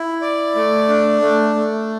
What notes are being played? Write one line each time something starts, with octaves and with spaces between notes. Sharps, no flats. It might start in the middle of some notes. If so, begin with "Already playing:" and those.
Already playing: E4
D5
A3
D4
A3
A3